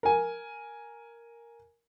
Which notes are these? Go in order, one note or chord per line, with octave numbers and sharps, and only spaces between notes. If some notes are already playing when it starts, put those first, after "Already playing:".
A#4 G#5